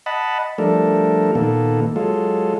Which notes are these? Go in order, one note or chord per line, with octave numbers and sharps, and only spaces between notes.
D#5 F#5 A5 B5
F3 G3 A3 D4 A4 A#4
A#2 D#3 A#3 B3 A4
F#3 G#3 F4 A4